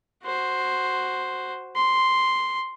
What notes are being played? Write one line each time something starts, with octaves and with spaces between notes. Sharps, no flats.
F#4 C5
C6